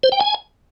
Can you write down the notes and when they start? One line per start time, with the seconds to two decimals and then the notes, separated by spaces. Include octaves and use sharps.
0.03 C5
0.12 G5
0.20 G#5